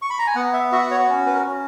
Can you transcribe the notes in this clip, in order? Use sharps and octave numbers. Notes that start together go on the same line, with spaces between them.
C#6
B5
A#5
G#5
B3 F#5
E5
F#4 E5
C#5
C#4
B4
A#4
C#4